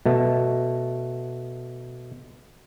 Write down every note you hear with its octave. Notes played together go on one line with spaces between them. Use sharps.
B2 A3